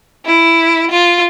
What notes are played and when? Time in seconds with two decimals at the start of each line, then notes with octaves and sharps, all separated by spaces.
0.25 E4
0.91 F4